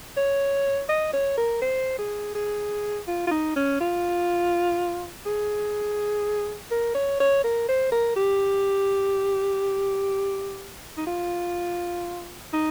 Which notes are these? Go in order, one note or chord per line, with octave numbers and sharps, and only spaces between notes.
C#5
D#5
C#5
A#4
C5
G#4
G#4
F4
F4
D#4
C#4
F4
G#4
A#4
C#5
C#5
A#4
C5
A#4
G4
D#4
F4
D#4